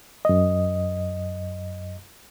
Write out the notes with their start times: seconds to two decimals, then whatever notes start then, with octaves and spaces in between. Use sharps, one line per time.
0.25 F#2 D#5